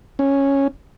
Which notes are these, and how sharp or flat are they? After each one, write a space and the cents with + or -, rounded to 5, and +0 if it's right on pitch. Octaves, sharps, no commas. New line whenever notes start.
C#4 -5